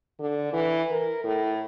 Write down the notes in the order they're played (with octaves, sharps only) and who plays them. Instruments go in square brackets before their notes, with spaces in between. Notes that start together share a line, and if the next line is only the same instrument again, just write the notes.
[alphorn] D3
E3
A#4
A2